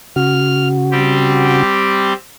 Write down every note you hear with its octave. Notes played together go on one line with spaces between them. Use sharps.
C#3 F#4 F6
G3 C4 G4